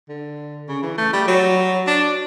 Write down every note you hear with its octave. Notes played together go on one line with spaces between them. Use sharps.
D3
C#3
E3
A3
G3
F#3
D4